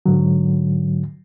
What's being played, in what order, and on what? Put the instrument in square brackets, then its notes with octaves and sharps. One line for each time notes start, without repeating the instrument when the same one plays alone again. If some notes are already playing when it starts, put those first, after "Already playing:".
[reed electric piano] G#2 D3 F#3